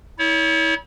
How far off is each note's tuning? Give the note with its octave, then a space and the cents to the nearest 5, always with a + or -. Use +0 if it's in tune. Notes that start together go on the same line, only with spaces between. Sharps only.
E4 -35 C#5 +30